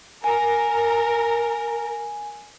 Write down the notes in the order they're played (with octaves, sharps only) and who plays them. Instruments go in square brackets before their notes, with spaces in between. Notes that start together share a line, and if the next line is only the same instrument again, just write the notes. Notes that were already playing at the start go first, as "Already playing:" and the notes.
[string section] A#4 [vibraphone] G#5